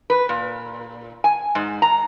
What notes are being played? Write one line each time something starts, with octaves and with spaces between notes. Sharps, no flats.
B4
A#2
G#5
G#2
A#5